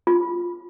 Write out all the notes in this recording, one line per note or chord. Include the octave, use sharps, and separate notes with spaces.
F4